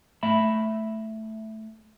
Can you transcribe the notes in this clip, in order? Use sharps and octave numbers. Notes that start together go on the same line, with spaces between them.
A3 E5 B5